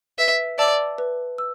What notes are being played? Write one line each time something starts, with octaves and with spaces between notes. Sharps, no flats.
B4 E5
D5 E5 A5 E6
B4
E6